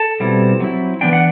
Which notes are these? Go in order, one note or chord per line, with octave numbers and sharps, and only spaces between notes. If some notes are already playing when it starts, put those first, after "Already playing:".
Already playing: A4 A5
B2 G3 C4 E4
F#3 C4 E4
E3 G3 B3 D4 G5
F#5